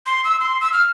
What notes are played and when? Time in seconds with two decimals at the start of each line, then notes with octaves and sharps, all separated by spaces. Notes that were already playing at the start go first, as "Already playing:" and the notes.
0.06 C6
0.24 E6
0.40 C6
0.61 E6
0.73 F6